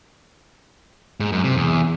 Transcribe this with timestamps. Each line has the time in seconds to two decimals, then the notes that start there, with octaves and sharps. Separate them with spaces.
1.20 G#2
1.32 F#2
1.44 C3
1.56 E2